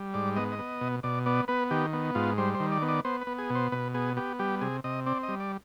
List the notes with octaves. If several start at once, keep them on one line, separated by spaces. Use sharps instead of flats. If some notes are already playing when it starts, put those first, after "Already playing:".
Already playing: G3
G#2 D5
B3 D#5
D#5
B3
B2
B2 D5
B3 D5
B3 B4
D#3 G4
B3
G#2 F4
G3 C5
C5
D#3
D5
B3
D5
B3 C5
B4
B3
G#4
B2
C5
B2 B4
B3 G#4
B3 G4
G3 G4
C3 G#4
C3 D#5
C4 D5
D#5
G3
D5